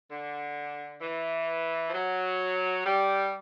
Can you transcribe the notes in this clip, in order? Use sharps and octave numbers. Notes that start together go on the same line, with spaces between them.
D3
E3
F3
F#3
G3